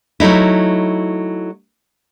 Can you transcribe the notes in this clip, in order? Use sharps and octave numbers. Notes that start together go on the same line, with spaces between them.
F#3 A3 D#4 E4